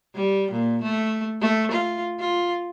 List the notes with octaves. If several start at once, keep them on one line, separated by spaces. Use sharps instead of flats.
G3
A#2
A3
A3
F4
F4